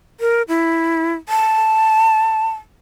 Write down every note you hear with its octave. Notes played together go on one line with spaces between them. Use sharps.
A#4
E4
A5